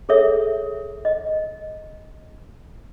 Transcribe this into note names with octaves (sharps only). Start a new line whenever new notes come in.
G#4 A4 C#5 E5
D#5